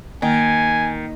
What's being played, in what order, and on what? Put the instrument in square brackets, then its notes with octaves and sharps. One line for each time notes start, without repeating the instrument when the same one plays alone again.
[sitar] D#3 [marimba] A#3 [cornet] G#5